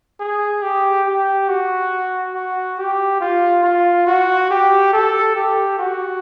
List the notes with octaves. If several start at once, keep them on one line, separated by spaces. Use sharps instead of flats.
G#4
G4
G4
F#4
F#4
G4
F4
F4
F#4
G4
A4
G4
F#4